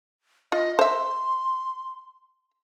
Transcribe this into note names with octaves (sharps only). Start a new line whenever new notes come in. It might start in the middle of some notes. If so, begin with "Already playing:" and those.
F4 D#5
C5 E5 C6